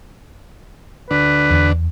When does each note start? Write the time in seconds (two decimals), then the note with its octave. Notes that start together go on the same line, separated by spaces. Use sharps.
1.11 D2 D3 D4 B4
1.50 E2